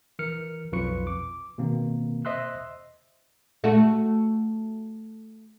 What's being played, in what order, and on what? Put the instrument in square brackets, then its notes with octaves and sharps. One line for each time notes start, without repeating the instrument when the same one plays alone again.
[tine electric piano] E3 A#4 F6 C#7
B1 F2 F4 B4 C#6 C#7
D6
B2 D#3 A#3 C4
C5 D#5 E5 C6 E6 F#6
[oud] A3 F#4